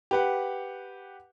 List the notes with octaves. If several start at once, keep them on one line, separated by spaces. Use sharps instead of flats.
G4 B4 F#5